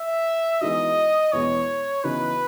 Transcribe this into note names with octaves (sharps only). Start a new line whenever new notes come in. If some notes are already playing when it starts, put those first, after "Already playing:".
Already playing: E5
E3 G#3 B3 D#4 F#4 D#5
E2 B2 G#3 C#5
C#3 E3 B3 D#4 F#4 B4